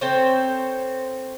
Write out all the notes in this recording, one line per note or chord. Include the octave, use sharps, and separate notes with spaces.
C4 A4 C5 C#5